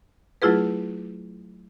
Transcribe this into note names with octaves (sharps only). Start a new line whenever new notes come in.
F#3 A3 E4 F4 G#4 B4